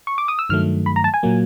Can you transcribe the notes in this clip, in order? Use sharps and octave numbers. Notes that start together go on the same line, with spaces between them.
C#6
D6
D#6
E6
G2 D#3 F#3 A3 F6
B5
A#5
A5
G#5
A#2 F#3 A#3